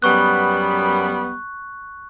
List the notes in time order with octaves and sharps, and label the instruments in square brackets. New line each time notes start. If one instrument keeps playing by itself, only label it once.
[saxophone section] F#2 G3 B3 [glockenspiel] C#6 F#6